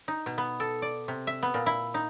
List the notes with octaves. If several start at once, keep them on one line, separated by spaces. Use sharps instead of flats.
D#4
B2
B3
A4
D5
C3
E5
B3
A#2
E4
D#4